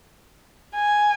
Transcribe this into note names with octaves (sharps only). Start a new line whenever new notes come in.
G#5